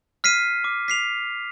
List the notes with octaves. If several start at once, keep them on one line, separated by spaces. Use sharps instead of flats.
F6 B6 C7 D#7
D6
B6 C7 F7